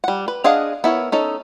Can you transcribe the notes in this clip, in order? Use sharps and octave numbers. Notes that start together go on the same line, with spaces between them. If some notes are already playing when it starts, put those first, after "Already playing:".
G3 F#5
B4
D4 G#4 D#5 F5 F#5
B3 E4 A#4 C#5
C#4 D#4 A4